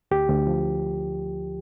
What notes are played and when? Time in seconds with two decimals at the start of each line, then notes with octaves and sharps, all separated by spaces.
0.11 D2 G4
0.29 D2
0.47 F3